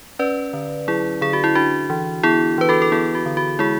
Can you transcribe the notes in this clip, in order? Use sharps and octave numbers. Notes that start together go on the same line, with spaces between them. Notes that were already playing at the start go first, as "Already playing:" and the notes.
C#4 B4 D5
D3
F#3 E4 G#4
D3 G#4
F#4
E4
D4 F#4
E3
B3 E4 G#4
E3 B4
F#4 A4
A4
B3 E4 G#4
F#4
D3
F#4
G#3 E4 G#4